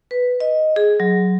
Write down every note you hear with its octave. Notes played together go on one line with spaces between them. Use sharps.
B4
D#5
G#4
F#3